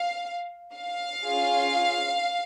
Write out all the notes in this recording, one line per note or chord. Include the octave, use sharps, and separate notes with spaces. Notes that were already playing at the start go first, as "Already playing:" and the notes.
Already playing: F5
F5
C#4 F4 G#4